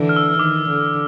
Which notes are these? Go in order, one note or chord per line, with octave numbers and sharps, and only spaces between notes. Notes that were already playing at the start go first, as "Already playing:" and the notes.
Already playing: D3 E3
F6
E6
D#3 D6
D3